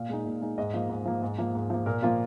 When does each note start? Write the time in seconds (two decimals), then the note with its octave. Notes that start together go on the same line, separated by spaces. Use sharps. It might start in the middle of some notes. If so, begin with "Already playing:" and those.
Already playing: A#2 F5
0.09 G#3 D#4
0.25 A#2
0.41 G#3 D#4
0.58 G#2 D#5
0.74 F3 A#3
0.89 G#2
1.05 F3 A#3
1.22 G#2
1.38 F3 A#3
1.55 G#2
1.70 F3 A#3
1.86 A#2 A#4
2.02 F3 A#3 F4